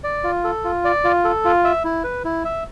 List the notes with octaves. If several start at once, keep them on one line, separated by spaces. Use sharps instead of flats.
D5
F4
A4
F4
D5
F4
A4
F4
E5
E4
B4
E4
E5